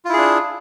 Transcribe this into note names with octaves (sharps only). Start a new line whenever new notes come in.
D4 E4 F4 G#4